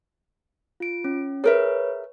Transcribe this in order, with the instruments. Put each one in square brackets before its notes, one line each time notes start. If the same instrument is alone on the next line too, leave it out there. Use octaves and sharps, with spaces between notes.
[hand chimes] F4 D7
C#4
[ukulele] G#4 A#4 E5 [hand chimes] B4 C#5